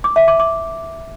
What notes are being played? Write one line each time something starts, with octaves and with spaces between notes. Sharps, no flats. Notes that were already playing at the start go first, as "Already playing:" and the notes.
D6
E5
D6
D6